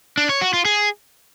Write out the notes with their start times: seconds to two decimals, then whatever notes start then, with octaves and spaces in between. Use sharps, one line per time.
0.18 D4
0.29 C#5
0.41 F#4
0.53 F4
0.65 G#4